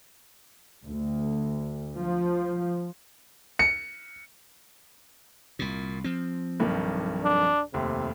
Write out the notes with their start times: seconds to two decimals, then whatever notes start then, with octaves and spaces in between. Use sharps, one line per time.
0.84 D2
1.98 F3
3.59 C#7
5.59 C2 A#2
6.04 F3 C4
6.60 B1 G2 D#3
7.24 D4
7.74 F1 D#2 C3